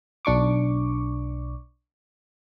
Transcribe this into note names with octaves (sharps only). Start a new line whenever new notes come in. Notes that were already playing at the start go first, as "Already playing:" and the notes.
B1 D4 C#6 D6